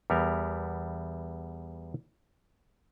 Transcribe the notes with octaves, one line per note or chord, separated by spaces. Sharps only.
E2 G3 B3 A#4